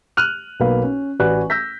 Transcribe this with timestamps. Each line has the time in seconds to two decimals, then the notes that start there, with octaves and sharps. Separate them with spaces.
0.17 F6 F#6 D#7 F7
0.60 B1 A#3 B4 F5
0.83 C#4
1.20 A1 F#4 B4 D5 G#5 F#6
1.50 E6 G6 A#6 B6